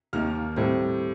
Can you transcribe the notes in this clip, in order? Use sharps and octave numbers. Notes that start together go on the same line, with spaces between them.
D#2 D#3 A#3 F6
A2 G3 C4